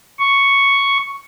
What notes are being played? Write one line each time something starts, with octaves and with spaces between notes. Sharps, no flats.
C#6